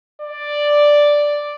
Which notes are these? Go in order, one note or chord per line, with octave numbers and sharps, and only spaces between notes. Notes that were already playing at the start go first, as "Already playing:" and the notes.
D5